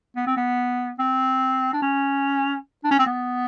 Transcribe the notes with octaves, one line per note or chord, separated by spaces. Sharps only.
B3
C4
B3
C4
D4
C#4
D4
C#4
C4
B3